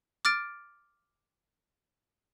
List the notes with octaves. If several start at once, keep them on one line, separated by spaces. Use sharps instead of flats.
D6 F6 A6 D7